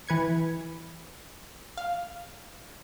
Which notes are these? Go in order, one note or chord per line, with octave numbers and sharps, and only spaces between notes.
E3 B4 G#6 C#7
F5